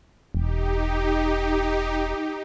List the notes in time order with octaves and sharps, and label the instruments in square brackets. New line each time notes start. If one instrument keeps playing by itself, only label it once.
[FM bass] E1 [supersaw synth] D#4 G4